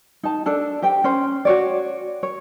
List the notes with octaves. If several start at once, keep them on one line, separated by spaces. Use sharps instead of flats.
D#4 A5
D4 A4 A5
G4 C5 G5
C#4 C5
F#4 C#5 D5
C#5